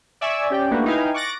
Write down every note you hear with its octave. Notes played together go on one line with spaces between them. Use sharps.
D5 E5 G#5 C#6 E6
C#4 G4 D5 G5
A3 A#3 D4 F#4 G4 B4
D#4 E4 B4 F5 G5 G#5
C#6 D6 F#6 A6 A#6 D7